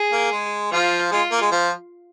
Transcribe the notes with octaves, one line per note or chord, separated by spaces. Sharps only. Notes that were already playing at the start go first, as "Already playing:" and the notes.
Already playing: G#4
A#3
G#3
F3 F4
G#3 F4
A#3
G#3
F3